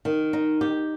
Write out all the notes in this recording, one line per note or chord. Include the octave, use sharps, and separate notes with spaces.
D#3
D#4
G4